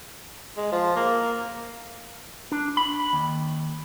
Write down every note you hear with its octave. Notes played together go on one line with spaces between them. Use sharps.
G#3
F3
A#3
D4
B5
D#2